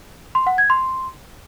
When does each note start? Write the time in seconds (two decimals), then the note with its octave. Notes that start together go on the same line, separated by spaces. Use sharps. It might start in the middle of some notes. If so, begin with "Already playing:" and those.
0.35 C6
0.47 F#5
0.58 G#6
0.70 C6